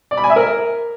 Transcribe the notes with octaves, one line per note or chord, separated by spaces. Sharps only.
D5
B5
G#5
E5
A#4